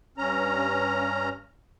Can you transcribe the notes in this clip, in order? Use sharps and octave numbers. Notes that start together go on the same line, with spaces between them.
G2 C#4 A#5